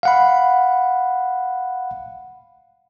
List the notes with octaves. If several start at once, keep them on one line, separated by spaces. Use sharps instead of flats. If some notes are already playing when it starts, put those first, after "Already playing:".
F5 F#5 B5